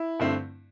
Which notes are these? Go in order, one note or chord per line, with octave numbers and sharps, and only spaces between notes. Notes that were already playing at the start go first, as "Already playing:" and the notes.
Already playing: E4
G2 D3 A3 C4